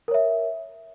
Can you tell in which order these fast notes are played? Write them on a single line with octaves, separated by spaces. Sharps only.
A#4 C#5 E5